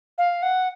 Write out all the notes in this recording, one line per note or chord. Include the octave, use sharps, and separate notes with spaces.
F5
F#5